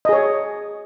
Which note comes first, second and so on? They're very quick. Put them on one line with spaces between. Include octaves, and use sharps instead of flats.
D#5 G#4 C#5